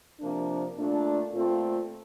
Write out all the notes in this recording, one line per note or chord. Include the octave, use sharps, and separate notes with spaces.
C3 F3 A#3 D4
A#2 A3 D4
A#2 A3 C4 F4